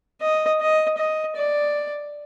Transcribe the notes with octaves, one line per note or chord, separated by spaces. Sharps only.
D#5
D#5
D#5
D5